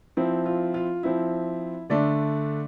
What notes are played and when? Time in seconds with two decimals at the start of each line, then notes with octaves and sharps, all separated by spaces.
0.17 F3 C4 E4
0.46 F4
0.74 F4
1.03 F3 C4 E4
1.90 D3 A3 D4 D5